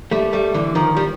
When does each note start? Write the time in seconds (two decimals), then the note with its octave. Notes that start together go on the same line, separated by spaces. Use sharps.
0.11 G3 A3
0.33 G3 A3
0.54 D3 E3
0.75 D#3 F3
0.97 G3